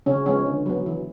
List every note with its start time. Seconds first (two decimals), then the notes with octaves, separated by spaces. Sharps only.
0.06 C#3 C#4
0.26 F3 G#3 B3 C#4
0.46 D3
0.66 F#3 B3
0.86 E3